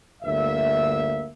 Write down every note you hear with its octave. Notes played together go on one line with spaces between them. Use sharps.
G1 D2 A#3 E5